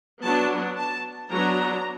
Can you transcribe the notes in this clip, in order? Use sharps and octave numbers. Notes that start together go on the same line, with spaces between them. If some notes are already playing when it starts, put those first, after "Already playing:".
F#3 B3 D4 A5
A5
F#3 B3 D4 A#5